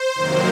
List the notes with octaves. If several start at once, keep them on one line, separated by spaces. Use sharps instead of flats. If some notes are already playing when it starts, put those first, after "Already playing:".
Already playing: C5
F2 C3 D#3 F#3 A#3